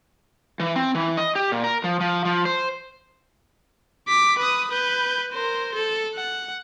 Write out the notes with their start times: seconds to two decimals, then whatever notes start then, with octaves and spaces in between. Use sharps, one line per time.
0.60 E3
0.76 C4
0.95 E3
1.17 D#5
1.35 G4
1.52 A#2
1.64 A#4
1.84 F3
2.00 F3
2.25 F3
2.45 C5
4.08 D6 B6
4.39 B4 D#6
4.71 B4 G6
5.33 A#4 C5
5.75 A4
6.15 F#5